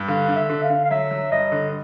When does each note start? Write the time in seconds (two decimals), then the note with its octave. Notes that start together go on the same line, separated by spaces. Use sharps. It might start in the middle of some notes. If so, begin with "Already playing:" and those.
Already playing: G2
0.08 D3 F5
0.29 D3
0.36 E5
0.50 D3
0.63 F5
0.70 D3
0.84 F5
0.91 F#3 E5
1.11 F#3
1.31 G2 D#5
1.52 D3